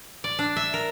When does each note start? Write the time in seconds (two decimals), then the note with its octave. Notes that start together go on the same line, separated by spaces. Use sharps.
0.24 D5
0.39 D4
0.56 E5
0.74 A#4